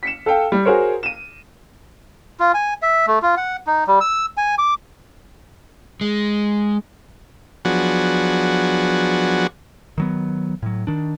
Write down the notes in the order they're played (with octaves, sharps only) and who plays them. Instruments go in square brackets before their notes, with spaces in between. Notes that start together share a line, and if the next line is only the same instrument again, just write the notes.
[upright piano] B6 C#7 E7
A4 F5 G5
G3
F#4 G#4 A#4 C5 C#5
D#7 E7
[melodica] F4
G#5
E5
A3
F4
F#5
D#4
G3
E6
G#5
D6
[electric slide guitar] G#3
[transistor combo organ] F3 F#3 B3 D4 F#4 G#4
[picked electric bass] D#3 F#3 B3
A2 F#3
D#3 D4